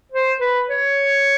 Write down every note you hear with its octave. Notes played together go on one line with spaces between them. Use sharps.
C5
B4
C#5